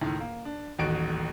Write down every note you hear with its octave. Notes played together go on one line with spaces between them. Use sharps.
C#2 A2 D#3
A#3
D4
D#1 A1 D#2 F#4 D7